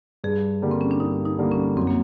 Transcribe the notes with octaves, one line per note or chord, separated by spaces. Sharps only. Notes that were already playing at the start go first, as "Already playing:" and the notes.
G2 G#4
D3 G3 A#3
C4
C#4
D4
G2 D#4
D#4
D3 G3 A#3
C#4
F#2 C4
A#3